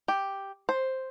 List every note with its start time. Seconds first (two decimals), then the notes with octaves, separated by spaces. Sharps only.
0.08 G4
0.69 C5